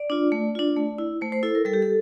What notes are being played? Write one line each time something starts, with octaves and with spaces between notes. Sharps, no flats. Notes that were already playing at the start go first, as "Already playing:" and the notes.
Already playing: D5
D4 F4
A3
D4 F4
A3
E4
A3 C5
C5
E4 A4
A#4
G3 A4
G4
A4